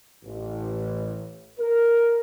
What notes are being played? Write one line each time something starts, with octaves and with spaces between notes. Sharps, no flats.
A1
A#4